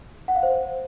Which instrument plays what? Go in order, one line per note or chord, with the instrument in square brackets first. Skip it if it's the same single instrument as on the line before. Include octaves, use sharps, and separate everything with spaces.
[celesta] F#5
F5
C5